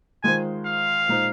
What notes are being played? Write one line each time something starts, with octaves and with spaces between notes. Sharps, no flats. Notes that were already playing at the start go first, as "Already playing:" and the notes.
D#3 G#3 F4 C5 G#5
F5
A#2 G#3 D#4 C5